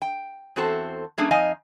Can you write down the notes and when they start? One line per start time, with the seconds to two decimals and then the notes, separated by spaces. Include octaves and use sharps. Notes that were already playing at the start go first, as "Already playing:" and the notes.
0.02 G5
0.56 E2 C4 F#4 A4 C5 A5
1.18 G3 A3 A#3 C#4 D4 G#4
1.31 F2 D#4 D#5 F5 G#5